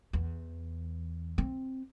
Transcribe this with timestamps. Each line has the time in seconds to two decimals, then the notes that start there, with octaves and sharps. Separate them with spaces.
0.13 E2
1.38 C4